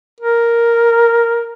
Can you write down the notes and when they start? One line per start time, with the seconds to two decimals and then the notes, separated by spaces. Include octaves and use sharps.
0.20 A#4